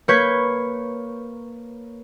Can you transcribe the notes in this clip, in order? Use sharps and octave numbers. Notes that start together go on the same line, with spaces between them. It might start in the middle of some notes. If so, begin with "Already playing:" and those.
A#3 B4 C#5 G6 G#6 B6